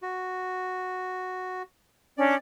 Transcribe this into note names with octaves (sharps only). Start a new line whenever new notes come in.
F#4
C#4 D4 D5